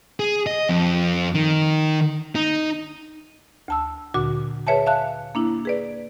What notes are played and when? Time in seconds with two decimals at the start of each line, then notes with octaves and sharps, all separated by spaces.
0.20 G#4
0.47 D#5
0.69 F2
1.35 D#3
2.35 D#4
3.68 D2 A5 E6
4.14 D2 A#2 D3 F#4 D6
4.67 G#4 B4 C#5 E5 G#5 A5
4.86 E5 F5 A5 F#6
5.35 A#3 D4 E4
5.65 G#4 B4 D5